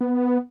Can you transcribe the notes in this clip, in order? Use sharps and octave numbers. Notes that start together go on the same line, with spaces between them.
B3